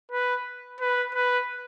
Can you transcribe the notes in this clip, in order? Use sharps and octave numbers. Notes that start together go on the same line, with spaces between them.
B4
B4
B4